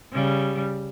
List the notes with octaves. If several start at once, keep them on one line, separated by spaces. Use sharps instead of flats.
C#3 G3